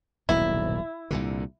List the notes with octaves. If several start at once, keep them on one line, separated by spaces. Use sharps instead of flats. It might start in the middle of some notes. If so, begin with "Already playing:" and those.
D#1 B1 G#2 E4
C2 A#2 D3